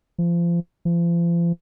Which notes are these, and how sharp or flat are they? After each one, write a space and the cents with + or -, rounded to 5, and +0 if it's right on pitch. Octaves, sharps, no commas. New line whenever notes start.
F3 -30
F3 -40